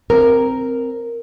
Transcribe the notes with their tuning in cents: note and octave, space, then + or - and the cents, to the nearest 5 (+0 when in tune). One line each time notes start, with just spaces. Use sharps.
C4 +0 A#4 +0